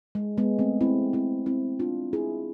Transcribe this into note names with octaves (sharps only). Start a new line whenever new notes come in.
G#3
G#3 B3
A3 C4
C4 E4
C4 E4
C4 E4
D4 F4
E4 G#4